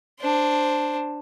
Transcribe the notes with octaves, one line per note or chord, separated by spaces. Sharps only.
D4 C5